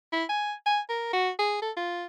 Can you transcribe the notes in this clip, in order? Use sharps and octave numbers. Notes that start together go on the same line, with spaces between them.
E4
G#5
G#5
A#4
F#4
G#4
A4
F4